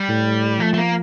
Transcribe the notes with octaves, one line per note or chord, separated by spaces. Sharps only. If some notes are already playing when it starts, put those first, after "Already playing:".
Already playing: G3
A2
F3 A3
A3
A#3